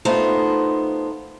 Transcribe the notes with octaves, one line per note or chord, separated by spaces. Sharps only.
A3 B3 D#4 F4 C5